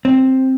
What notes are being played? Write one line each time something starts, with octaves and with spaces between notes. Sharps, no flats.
C4